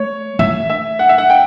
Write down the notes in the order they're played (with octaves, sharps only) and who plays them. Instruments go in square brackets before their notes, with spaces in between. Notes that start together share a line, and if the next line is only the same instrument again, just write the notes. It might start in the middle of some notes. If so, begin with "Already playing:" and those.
Already playing: [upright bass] A3 [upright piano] C#5
[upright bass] A3 [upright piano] E5
[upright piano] E5
F#5
E5
F#5
G5